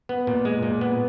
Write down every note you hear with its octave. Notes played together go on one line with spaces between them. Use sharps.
B3
A#2
G#3
A#2
B3